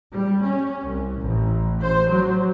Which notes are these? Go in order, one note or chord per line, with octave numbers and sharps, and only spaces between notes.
G3
C#4
C2
A1
C5
F#3